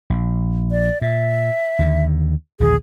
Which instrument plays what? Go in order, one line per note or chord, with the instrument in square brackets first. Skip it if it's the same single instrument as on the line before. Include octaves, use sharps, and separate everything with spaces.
[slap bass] A#1
[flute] D5
[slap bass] A#2 [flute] E5
[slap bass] D#2 D3
[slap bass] A#1 D#2 D3 [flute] G#4